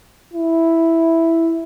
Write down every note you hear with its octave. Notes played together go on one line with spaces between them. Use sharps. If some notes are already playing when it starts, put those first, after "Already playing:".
E4